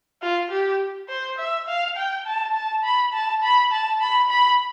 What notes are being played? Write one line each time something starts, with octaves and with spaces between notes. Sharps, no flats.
F4
G4
C5
E5
F5
G5
A5
A5
B5
A5
B5
A5
B5
B5